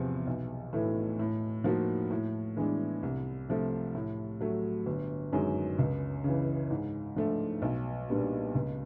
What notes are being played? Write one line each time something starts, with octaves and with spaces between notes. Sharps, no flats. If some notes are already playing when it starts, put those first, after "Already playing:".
Already playing: E2 C3 F3
B1
A2 E3 A3
A2
F3 A#3 D#4 F#4
A2
E3 G#3 B3 D4
C2
C3 F3 A3
A2
F#3 A3
G1
F#2 D#3 G#3
C#2
C#3 E3
G#2
F3 A3 D4
B1
A#2 G3 B3 D4
C#2